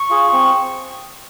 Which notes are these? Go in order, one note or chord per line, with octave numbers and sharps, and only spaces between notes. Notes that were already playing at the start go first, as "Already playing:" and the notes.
Already playing: C#6
F4 G#4
C4